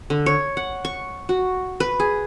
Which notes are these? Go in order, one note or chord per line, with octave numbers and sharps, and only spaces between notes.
D3
C#5
F#5
C#6
F#4
B4
G#4